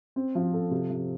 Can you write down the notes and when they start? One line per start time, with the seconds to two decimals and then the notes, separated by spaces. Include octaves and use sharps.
0.16 C4
0.35 F3
0.53 A4
0.71 C3
0.90 F3